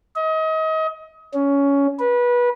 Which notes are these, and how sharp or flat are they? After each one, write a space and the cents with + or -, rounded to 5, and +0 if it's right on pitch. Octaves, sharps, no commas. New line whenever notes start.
D#5 +30
C#4 +15
B4 -25